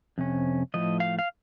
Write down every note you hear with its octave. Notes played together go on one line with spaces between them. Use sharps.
F2 C3 C#4
A2 F3 A3 D#5
F5
F5